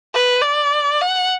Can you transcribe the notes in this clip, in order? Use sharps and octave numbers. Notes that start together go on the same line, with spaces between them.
B4
D5
F#5